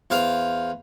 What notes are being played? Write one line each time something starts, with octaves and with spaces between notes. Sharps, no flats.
E2 C5 F5